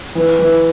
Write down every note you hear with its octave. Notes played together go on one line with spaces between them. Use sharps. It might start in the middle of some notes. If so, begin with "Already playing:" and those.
E3
E3